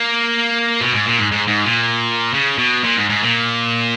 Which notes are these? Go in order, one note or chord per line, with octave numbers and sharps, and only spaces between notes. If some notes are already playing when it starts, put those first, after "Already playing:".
Already playing: A#3
B2
G#2
A#2
G#2
G#2
G#2
A#2
C#3
B2
A#2
G#2
G#2
A#2